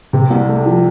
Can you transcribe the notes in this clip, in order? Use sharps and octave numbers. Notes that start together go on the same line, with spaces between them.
C3
C2
A3
F3